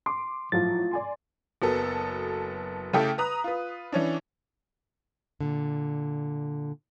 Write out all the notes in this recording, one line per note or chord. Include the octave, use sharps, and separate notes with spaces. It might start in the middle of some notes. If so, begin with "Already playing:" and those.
C6 D6
A2 F3 F#3 F4 A6
D5 G#5 C6
F#1 F#3 B3 A4
C#3 A3 E4 G4 A4
B4 A#5 D#6 F#6
F4 B4
E3 C#4 D4
A#2 D3